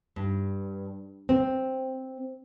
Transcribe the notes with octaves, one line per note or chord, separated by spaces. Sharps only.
G2
C4